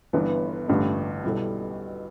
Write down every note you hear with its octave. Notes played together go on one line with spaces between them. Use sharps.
G1 G2 E3 B3
A1 G2 D3 A3 G4
B1 B2 G3 E4 A4